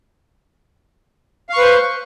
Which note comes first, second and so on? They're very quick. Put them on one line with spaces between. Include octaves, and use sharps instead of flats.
F5 C#6 B4 C5